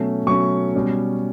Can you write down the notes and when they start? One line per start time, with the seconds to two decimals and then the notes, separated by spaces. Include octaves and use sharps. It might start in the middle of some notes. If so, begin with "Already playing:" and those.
Already playing: B2 F#3 A3 C#4
0.26 B2 F#3 A3 C#4 C#6
0.75 B2 G3 C#4